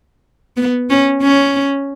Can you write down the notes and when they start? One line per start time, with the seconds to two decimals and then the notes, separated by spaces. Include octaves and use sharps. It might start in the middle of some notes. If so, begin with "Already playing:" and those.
0.57 B3
0.90 C#4
1.22 C#4